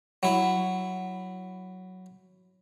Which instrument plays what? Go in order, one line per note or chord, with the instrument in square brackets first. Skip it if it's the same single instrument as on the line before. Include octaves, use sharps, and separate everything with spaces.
[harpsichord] F#3 E4